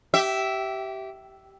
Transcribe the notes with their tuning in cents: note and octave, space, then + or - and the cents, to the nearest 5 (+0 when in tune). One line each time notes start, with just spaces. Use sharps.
G4 -20 E5 +0